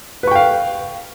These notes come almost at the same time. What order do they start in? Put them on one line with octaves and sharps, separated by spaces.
B4 C#6 G5 F5